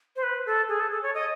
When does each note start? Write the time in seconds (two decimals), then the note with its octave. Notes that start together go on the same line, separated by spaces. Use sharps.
0.16 C5
0.23 B4
0.46 A4
0.69 G#4
0.80 A4
0.91 A4
1.03 C#5
1.14 D#5